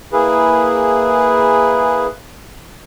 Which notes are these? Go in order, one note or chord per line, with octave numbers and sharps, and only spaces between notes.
A#3 E4 G#4 B4